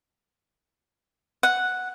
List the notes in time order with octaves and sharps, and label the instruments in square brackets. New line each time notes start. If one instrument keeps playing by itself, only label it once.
[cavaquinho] F#5